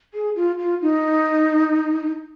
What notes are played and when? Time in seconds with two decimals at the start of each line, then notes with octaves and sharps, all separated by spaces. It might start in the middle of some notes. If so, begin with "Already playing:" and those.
0.13 G#4
0.35 F4
0.58 F4
0.81 D#4